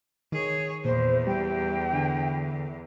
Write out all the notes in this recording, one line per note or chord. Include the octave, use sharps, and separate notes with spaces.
D#3 G#4 C#5
E2 A#2 C5
G3 G5
D3